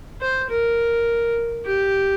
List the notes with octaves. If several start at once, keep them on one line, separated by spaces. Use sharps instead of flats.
C5
A#4
G4